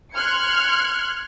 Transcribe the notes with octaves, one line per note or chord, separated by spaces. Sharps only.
C6 F6 F#6 G#6 C#7